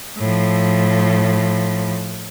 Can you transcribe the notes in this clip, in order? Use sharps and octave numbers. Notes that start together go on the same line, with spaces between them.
A2 F3